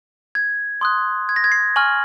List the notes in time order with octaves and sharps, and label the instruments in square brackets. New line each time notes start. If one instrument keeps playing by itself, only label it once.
[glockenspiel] G#6
C6 D#6 F#6
G#6
A#6
G#6
C7
G#5 C#6 F6 F#7